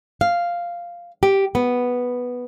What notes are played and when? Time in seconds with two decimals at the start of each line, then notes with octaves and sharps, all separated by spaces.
0.21 F5
1.23 G4
1.55 B3